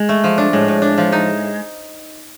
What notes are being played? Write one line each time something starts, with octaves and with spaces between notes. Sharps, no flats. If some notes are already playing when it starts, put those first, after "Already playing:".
Already playing: G#3
A3
F3
D4
A2 G#3
A2
D4
F3
D#4